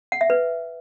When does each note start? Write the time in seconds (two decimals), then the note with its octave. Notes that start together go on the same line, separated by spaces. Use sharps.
0.12 F#5
0.21 E5
0.30 B4